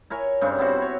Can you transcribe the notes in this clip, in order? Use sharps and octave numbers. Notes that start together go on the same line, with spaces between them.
E4 A#4 C#5 G#5
G2 C#3 G3 C4
B3 C4 E4 F#4
C#5